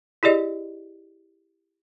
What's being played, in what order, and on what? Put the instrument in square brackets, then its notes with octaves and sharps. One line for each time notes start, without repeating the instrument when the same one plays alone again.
[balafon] E4 G4 G#4 D5 D#5